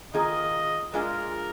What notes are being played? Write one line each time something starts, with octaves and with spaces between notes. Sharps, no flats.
D#3 A#3 F4 G#4 D#5
G#3 D4 F4 G#4 A#4